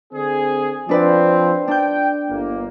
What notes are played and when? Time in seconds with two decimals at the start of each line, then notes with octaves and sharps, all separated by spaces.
0.13 D3 C4 G#4
0.89 F3 C4 D4 B4 D5
1.68 D4 G5 G6
2.29 G1 A#3